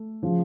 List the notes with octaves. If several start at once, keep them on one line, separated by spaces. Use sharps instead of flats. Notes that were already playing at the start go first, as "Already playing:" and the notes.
Already playing: A3
C#3 F3